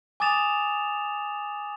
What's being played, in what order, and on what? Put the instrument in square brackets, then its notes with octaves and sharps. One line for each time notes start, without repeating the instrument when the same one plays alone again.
[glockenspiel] G#5 D6 D#6 A6 E7 F7